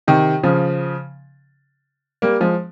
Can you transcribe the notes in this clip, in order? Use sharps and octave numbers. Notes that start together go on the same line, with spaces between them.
C3 D#3
C#3 F3
G3 A#3
F3 G#3